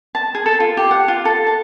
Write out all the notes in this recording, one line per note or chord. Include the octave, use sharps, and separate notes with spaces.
A5
G#4
A4
F4
G4
F#5
F4
A4
A5